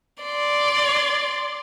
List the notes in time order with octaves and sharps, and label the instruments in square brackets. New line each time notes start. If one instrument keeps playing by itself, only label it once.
[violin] D5 C6